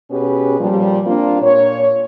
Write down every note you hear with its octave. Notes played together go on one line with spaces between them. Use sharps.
B2 C#4 G4 G#4 B4
A#2 F3 G3
A#3 C4 D4 F4
A#2 C#5